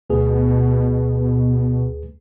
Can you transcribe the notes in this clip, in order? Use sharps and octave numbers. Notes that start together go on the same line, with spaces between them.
D2 B2 G#4 B4